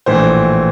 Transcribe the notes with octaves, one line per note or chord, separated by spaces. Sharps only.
A#1 A2 E3 C5